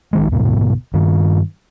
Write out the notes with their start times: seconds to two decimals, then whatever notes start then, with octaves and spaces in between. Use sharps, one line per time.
0.13 A#1 D#3 G#3
0.32 D1 D2 G#2 B2
0.93 G2 D#3